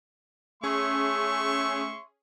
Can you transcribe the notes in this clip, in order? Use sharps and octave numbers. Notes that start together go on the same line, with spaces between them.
A3 C#4 G#4 E5 C6 C#6